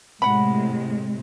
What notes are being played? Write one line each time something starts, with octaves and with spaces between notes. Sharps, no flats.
A2 C3 G#3 F#5 B5